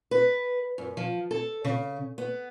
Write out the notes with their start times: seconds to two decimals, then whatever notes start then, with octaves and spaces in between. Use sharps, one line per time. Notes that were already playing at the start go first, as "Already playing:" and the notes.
0.11 B4
0.78 F#2
0.97 F3
1.31 A4
1.64 C#3
2.18 B3